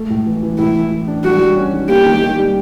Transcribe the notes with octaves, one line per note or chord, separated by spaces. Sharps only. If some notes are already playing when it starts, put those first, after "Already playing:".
Already playing: A3
A2
E3
E3
A2 E4
E3
E3
D4
G3 F#4
G3
C#4
D#3
A#3 G4
D#3
D#3
G3